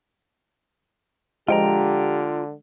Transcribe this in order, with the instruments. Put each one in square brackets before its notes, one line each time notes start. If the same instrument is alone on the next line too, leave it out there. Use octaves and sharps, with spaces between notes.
[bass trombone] D3 [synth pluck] F3 G#3 [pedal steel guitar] F4 G5 A#5 [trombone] G4